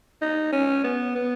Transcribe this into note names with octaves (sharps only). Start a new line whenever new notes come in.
D#4
C#4
B3
B3